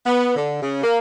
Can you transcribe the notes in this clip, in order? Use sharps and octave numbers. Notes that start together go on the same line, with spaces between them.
B3
D3
C#3
A#3